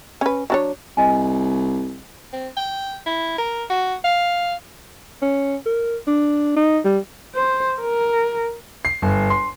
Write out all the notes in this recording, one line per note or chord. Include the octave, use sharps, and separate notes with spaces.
C#4 B4
F#3 D4 C#5
C2 D#5 G#5
C4
G5
E4
A#4
F#4
F5
C#4
A#4
D4
D#4
G3
C5
A#4
C7
G1
C6